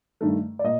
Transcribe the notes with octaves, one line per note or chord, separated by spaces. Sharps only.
G2 D#3 A3
D5
A#2 D#5